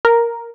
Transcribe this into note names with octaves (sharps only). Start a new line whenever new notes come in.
A#4